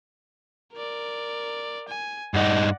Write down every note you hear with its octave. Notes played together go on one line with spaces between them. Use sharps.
A#4 D5
G#5
G2 D#4 D5 F#5